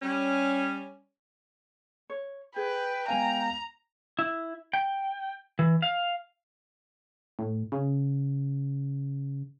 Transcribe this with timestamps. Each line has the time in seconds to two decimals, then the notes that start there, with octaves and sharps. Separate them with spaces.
0.02 G3 C#4
2.10 C#5
2.56 G#4 B4 G5
3.08 G#3 B3 F5 G#5 A#5
4.19 E4
4.74 G5
5.59 E3
5.82 F5
7.39 A2
7.72 C#3